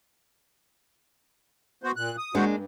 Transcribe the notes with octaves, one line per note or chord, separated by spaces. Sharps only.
B3 F#4 C5
A#2 F#6
D#6
G#3 A#3 D4 F#4 C5 F#5
G2